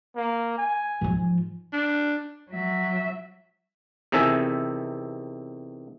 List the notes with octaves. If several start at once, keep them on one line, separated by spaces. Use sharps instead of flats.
A#3
G#5
G#2 F3
D4
F#3 E5
E2 C3 D#3 A4 E5 G#5